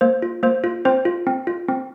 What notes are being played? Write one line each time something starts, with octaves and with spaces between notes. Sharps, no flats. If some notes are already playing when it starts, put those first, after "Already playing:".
A#3 C5
F4
A#3 C5
F4
C4 C5
F4
C4
F4
C4